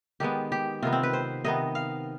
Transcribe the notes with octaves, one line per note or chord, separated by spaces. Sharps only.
D#3 G#3 B3 G4
G4
C3 D#3 B3 F4
C4
B4
C5
C3 D#3 B3 D#5
F5